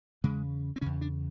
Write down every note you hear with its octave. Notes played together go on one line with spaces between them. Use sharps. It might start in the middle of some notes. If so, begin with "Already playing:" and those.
E2 C#3 G#3
C4
E2 C#3 C#4
D4